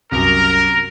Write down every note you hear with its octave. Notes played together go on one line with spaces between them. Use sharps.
C2 F#2 A#4